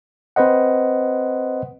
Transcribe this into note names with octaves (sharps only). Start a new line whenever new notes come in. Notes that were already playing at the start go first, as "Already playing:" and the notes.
C4 B4 C5 D#5 F#5